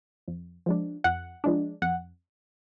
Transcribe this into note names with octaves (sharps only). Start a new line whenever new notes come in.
F2
F3 G#3 D4
F2 F#5
F3 G#3 D4
F2 F#5